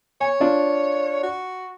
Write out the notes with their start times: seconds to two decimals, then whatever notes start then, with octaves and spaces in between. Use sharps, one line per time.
0.21 C#5 G#5
0.40 D4 F4
1.23 F#4